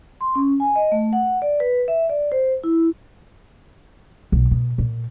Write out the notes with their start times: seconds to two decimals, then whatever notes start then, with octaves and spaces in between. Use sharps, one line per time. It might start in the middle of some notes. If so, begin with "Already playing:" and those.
0.21 C6
0.35 C#4
0.60 G#5
0.76 D#5
0.92 A3
1.13 F#5
1.42 D5
1.60 B4
1.88 E5
2.10 D5
2.32 C5
2.64 E4
4.32 B1
4.51 B2
4.78 A#2